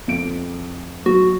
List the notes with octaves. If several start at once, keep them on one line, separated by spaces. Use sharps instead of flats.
F2 D7
F#3 F#4